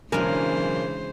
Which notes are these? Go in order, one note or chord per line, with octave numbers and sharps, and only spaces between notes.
B1 C#3 E3 G#3 D4 A#4 C5 G#5